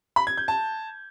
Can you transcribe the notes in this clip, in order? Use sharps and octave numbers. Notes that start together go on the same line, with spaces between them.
B5
G#6
G6
A5